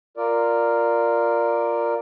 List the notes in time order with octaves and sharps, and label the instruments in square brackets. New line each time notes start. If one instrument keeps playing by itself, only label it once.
[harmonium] F4 A#4 D5